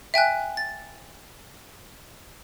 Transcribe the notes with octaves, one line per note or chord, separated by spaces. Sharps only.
E5 G5 G#5 F#6
A6